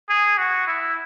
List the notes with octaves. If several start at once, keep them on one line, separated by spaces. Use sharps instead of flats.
G#4
F#4
E4